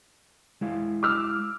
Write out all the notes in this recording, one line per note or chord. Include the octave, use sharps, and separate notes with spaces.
G#3 E4 F5
D6 E6 F6